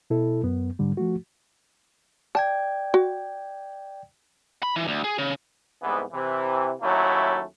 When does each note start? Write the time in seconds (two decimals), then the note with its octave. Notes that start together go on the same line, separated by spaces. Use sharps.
0.10 B2 E4 A4
0.43 F#2 B3
0.79 G#2 D3 G3
0.97 F3 A3 F#4
2.35 D5 G5 A5 G#6
2.94 F#4
4.63 B5
4.76 E3
4.88 D2
5.04 G#4
5.18 C#3
5.82 C2 G#2 E3 B3
6.12 C3 E3
6.81 D#2 F#3 A3 C#4 E4